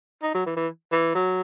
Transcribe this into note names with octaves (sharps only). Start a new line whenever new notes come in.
D#4
F#3
E3
E3
E3
F#3